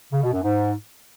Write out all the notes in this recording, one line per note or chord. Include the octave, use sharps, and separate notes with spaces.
C#3
B2
F#2
G#2